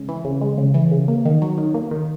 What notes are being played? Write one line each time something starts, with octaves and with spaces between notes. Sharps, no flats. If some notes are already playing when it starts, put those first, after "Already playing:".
Already playing: C#3 G#3
E3
C#3
G#3
C#3
E3
C#3
A#3
D#3
F#3
D#3
A#3
D#3